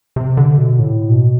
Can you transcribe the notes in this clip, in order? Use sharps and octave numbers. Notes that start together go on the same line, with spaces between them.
C3
D3
B2
A2
B2